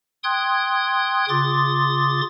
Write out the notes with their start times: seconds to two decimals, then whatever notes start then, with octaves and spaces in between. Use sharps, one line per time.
0.24 G5 C6 D#6 F#6 G#6
1.29 C#3 F4 C6 D6 D#6 A6